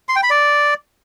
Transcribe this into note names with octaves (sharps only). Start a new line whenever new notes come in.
C6
G5
B5
D5